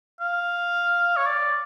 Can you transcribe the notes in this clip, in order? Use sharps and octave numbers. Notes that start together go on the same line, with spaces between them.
F5
C#5
D5